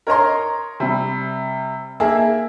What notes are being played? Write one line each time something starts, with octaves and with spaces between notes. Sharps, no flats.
A#4 C#5 D#5 A#5 C6
C3 G3
A#3 G#4 E5 A5